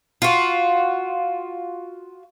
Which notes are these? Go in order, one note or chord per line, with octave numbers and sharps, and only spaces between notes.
F4 F#4